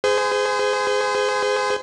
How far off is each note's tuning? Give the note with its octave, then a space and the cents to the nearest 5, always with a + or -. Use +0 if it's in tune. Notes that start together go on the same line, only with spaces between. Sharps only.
G#4 +0 C5 -35